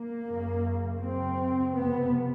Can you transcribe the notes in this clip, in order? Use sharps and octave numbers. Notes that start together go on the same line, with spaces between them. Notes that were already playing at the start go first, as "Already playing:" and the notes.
Already playing: A#3
F#2 C#3
F#2 C#3 C4
F2 C3 B3